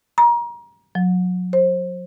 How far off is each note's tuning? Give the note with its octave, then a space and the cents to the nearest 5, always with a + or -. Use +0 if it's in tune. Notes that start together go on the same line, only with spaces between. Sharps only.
A#5 +30
F#3 -30
C5 +25